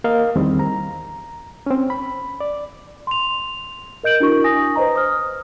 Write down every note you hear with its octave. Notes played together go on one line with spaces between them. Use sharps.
A#3 A#4 D#5 F5
E2 D#3 G3 C4
A#5
C4 C#4
B5
D5
C6 F7
A#4 D#5 G6 D7 F#7
D4 E4 F#4 A#4 C#6
G#5 D#6 A#6
B4 C5 D#5 A#5
D#6 F6